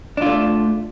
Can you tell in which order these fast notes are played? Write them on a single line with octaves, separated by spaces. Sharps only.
D4 F4 A3